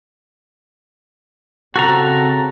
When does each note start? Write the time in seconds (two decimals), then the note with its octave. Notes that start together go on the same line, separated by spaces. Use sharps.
1.76 C#3 C4 F#4 A4 A#5